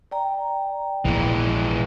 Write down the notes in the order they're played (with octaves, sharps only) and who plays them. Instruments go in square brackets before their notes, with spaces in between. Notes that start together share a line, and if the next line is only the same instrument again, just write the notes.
[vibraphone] D5 G5 A#5
[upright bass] A#1 A#2 [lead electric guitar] E3 G#3